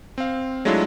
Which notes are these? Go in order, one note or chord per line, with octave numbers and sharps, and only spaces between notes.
C4 F5
F#3 G#3 A3 D4 E4 F4